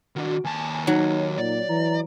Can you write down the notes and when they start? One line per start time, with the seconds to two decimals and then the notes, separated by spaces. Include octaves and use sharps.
0.16 D#3 D4 F#4
0.45 D#2 G#5 A5
0.87 F#3 D#4
1.38 A#2 D5
1.69 E3 A#5